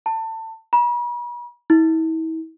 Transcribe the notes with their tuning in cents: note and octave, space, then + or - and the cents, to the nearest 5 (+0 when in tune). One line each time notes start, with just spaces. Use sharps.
A5 +25
B5 -45
E4 -40